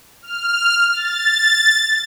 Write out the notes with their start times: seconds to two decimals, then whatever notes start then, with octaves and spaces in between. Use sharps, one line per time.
0.22 F6
0.93 A6